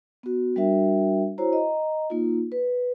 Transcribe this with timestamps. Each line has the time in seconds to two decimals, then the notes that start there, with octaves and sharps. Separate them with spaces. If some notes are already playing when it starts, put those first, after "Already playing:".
0.23 B3 F#4
0.56 G3 D4 F#4 A#4 E5 G5
1.38 E4 F#4 C5 C#5 A#5
1.53 D#5 A#5
2.10 A#3 D#4 F4
2.52 B4